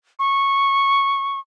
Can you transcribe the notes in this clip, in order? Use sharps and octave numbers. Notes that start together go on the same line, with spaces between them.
C#6